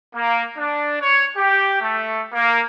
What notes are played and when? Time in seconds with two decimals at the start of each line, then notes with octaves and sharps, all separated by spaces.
0.15 A#3
0.58 D4
1.01 C#5
1.37 G4
1.81 A3
2.34 A#3